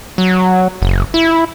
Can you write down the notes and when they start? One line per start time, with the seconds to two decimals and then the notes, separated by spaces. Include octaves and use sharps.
0.18 F#3
0.82 F#1
1.14 E4